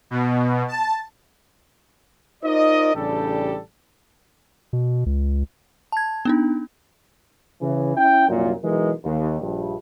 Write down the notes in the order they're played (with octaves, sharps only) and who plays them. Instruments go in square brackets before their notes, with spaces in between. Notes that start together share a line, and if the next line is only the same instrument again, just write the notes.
[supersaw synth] B2
A5
[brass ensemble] D#4 F4 A#4 C5 D5 D#5
A1 C#3 G3 D4 G4 A4
[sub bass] B2
C#2
[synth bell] A5 G#6
B3 D4 D#4
[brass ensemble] C#3 E3
C#4 E4 G5
C2 F#2 A#2
B1 E3 G#3 A#4
D#2
A#1 G2